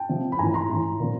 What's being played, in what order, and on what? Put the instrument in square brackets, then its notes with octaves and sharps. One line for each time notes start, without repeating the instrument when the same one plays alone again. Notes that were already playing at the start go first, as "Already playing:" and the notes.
Already playing: [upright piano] G5 A5
C3 F3
B5
A2 E3 G#5 A#5
A#5 C6
A2 E3
A#2 F3